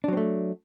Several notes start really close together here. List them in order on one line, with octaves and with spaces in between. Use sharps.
D4 F#3 C4 A3